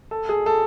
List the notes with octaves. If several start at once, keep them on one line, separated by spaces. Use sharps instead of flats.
A4
G#4
A4